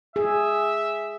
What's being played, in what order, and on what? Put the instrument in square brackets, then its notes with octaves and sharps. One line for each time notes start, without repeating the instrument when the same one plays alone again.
[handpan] G#4 [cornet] E5